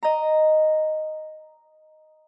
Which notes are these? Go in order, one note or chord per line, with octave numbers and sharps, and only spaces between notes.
D#5 A#5